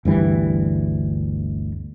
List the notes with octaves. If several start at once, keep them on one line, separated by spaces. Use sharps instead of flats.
G1 D2 E3 G3